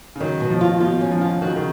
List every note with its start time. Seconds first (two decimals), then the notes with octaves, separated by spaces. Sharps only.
0.16 C#3
0.20 D#3 F#3
0.40 B2
0.50 F3
0.61 F4
0.80 B2 F4
1.01 C#4
1.12 F3
1.21 F4
1.42 D#3 F#4
1.49 C#3
1.56 D#3